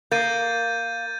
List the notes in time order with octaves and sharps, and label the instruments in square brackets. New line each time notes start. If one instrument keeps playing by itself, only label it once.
[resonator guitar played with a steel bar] A#3 [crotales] G6 A6 D#7